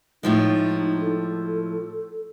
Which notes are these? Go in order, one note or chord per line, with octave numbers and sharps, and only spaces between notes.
A2 F3 G#3 D#4
A4